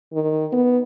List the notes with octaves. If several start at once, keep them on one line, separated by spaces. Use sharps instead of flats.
D#3
B3